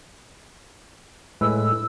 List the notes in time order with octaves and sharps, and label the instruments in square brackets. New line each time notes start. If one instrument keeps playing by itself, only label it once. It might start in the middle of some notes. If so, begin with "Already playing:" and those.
[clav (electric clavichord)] A2 G#3 B4 [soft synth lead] E6